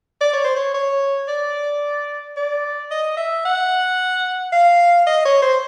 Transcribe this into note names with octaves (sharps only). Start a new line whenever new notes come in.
D5
C#5
C5
C#5
C#5
D5
D5
D#5
E5
F#5
F5
D#5
C#5
C5